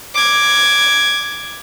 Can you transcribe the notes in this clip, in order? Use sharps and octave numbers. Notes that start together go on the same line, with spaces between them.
D6 G#6